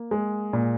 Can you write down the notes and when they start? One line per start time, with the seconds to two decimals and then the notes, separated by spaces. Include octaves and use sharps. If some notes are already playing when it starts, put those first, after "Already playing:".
Already playing: A#3
0.11 G#3
0.53 A#2